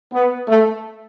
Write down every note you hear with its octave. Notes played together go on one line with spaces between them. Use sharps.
B3
A3